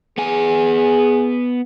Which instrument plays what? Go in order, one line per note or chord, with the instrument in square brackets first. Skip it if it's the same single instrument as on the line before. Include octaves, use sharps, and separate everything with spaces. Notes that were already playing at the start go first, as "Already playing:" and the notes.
[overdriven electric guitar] B3 G#5 [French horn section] G#4